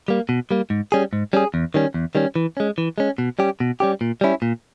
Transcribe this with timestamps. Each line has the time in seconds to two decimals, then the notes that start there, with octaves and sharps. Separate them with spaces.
0.08 G3 A#3
0.29 B2
0.51 G3 A#3
0.70 G#2
0.92 G3 C#4 G#4
1.13 G#2
1.33 G3 C#4 G#4
1.54 E2
1.74 D#3 G3 C#4
1.94 E2
2.15 D#3 G3 C#4
2.36 E3
2.57 G#3 C#4
2.78 E3
2.98 G#3 C#4
3.18 B2
3.39 G3 C#4 G4
3.60 B2
3.80 G3 C#4 G4
4.01 A#2
4.21 G3 C#4 E4
4.42 A#2